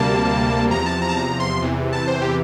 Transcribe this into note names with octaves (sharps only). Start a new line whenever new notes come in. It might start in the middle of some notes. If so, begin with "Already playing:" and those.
Already playing: D2 C3 G3 A#3 A5
E2 C3 F3 A#5
A5
A#5
A5
A#5
C6
E2 C3 E3
A5
C5
G4